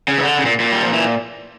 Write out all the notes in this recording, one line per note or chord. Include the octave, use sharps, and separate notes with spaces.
C#3
E3
D3
C#3
A#2
A#2
G3
F3
E3